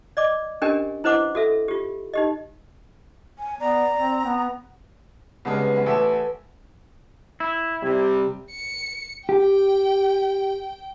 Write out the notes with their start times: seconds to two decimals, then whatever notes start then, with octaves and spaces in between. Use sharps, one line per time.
0.17 D5 D#5 D6
0.62 C#4 D4 G4 A#4 D#5 G#5
1.04 E4 B4 C5 D#5 F#5 D6
1.35 F#4 A4 E5
1.68 F4 G4
2.14 D#4 G4 D#5
3.38 G#5
3.60 B3 D5 A#5
3.96 C4
4.26 B3
5.45 C2 C#3 G#3 B3
5.75 B3 E5 G#5
5.86 A1 G#4 A4 B4 E5 E7
7.40 E4
7.83 C3 G3
8.51 C#7
9.29 G4 G5